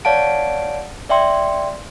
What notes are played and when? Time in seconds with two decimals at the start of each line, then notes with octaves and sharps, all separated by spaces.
0.05 C#5 D5 F5 F#5 A5 D7
1.10 D5 E5 G5 C6